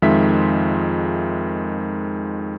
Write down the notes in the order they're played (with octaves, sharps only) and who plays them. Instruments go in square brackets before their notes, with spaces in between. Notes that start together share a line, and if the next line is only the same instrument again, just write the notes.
[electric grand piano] F2 D#3 G#3 F4 E5 B6